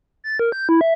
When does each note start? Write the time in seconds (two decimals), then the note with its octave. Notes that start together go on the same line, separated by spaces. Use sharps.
0.24 A6
0.39 A#4
0.52 G6
0.69 E4
0.81 E5